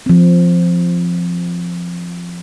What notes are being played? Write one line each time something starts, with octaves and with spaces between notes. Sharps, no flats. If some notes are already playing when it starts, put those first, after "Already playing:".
F3 C4